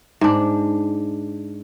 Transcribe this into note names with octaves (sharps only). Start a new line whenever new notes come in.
G#2 D4